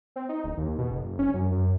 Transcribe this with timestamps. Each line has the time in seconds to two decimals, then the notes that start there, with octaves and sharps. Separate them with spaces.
0.16 C4
0.29 D#4
0.44 D1
0.57 D#2
0.78 B2
0.91 F#1
1.19 C#4
1.34 F#2
1.51 F#2